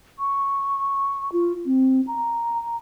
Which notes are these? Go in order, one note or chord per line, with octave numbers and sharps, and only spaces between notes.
C#6
F4
C4
A#5